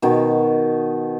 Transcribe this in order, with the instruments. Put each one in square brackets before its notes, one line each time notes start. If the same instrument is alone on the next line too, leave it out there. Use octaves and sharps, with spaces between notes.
[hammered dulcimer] B2 D#3